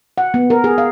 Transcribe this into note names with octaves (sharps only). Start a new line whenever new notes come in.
F#5
B3
A#4
G#4
F5